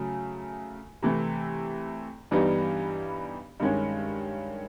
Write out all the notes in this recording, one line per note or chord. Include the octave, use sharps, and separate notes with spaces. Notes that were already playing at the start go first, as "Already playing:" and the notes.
Already playing: C#3 F#3 A3
C3 E3 A3
G2 E3 G3 B3 D#4
G2 D#3 G#3 C#4